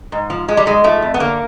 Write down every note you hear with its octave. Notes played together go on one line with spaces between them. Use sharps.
G#2
F3
F3 G#3
G3
G#2 G#3
F3 A3
F2
B3
D3 A#3